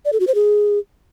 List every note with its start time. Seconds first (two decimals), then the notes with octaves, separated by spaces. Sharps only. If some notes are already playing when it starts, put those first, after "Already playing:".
0.05 D5
0.13 A4
0.20 F#4
0.27 C5
0.35 G#4